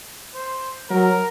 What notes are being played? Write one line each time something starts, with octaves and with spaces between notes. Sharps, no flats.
C5
F#3 A#4